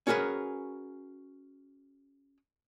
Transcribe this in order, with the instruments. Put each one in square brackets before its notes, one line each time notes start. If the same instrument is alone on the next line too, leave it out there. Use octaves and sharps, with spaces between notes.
[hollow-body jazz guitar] C#4 F#4 G#4 A#4 B4